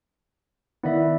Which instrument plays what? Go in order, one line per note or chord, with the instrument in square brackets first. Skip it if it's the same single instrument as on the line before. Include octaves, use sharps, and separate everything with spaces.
[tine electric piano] D#3 B3 [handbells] E4 D5 E5